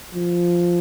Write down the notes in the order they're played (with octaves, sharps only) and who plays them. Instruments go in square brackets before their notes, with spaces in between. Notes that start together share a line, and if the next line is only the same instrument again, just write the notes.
[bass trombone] F3